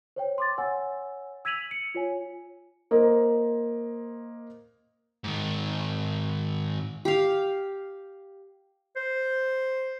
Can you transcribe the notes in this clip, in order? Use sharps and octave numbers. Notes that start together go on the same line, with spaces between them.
C5 C#5 G5
C6 D6 A6
C#5 F#5 G#5 E6
E6 G#6 B6 D#7 F7 F#7
C#7
F4 C#5 G#5
A#3 C5 D#5
G#2 D#3
G4 F5
C5